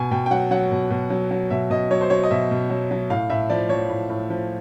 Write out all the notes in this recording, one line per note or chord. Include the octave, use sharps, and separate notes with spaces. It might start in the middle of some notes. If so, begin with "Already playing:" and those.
Already playing: B2 G#5
B2 G5
G5
F#3 F#5
F#3 F#5
B2
B2
F#3
F#3
B2 E5
B2 D#5
F#3 C#5
C5
F#3 C#5
D#5
B2 E5
B2
F#3
F#3
A2 F5
A2 E5
F3 D5
F3 C#5
A2
A2
F3